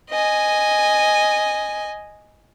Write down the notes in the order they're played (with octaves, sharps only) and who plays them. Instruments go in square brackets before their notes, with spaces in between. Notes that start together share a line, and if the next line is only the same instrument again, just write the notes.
[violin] D#5 G#5